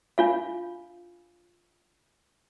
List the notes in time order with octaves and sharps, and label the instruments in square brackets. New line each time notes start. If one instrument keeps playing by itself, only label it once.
[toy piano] D4 F4 F5